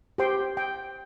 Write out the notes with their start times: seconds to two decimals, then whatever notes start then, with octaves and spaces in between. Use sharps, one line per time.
0.18 G4 C5 G5 C6
0.57 G5